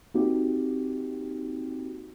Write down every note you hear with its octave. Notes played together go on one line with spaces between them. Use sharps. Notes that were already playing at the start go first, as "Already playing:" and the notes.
A#3 C4 D#4 F#4 G4